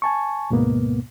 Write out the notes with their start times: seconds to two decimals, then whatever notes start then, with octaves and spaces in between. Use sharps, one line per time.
0.02 G#5 A5 C#6
0.50 D2 G#2 B2 A#3 B3